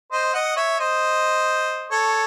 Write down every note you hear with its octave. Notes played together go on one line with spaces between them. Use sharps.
C5 D#5
D#5 F#5
C#5 E5
C5 D#5
A4 C#5